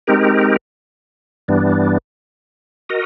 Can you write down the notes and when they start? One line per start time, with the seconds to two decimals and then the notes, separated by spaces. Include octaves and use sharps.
0.07 G#3 C4 D#4 G4 A#4
1.48 G2 E3 G3 B3 D4
2.89 F#4 A#4 D#5